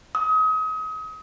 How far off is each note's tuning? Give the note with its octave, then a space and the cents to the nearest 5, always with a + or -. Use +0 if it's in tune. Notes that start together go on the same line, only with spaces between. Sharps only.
D#6 +35